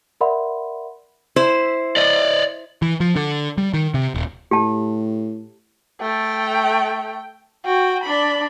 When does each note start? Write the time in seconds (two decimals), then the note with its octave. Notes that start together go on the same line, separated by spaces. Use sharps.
0.21 A#4 D5 E5 F#5 B5 C6
1.36 E4 C5
1.97 D5 D#5
2.82 E3
3.00 F3
3.16 D3
3.58 G3
3.74 D#3
3.94 C3
4.14 D#1
4.51 A2 G4 A5
6.01 A3 G5
7.65 F#4 G5
8.04 D4 B5